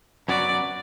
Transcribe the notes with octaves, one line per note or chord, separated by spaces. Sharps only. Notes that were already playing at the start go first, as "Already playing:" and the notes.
F#2 F#3 B3 F#4 D5